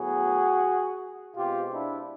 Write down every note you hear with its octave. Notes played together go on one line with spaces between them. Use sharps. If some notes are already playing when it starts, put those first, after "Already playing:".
Already playing: A2 F#3 B3 F#4 G#4
B2 G#3 C4 F4 G4
D4 E4